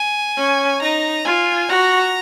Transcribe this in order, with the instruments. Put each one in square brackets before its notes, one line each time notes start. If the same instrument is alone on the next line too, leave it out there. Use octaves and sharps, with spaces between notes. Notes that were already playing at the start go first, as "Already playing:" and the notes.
Already playing: [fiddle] G#5
[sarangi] C#4
[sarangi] D#4 [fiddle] A#5
[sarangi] F4 [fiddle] G#5
[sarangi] F#4 [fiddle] A#5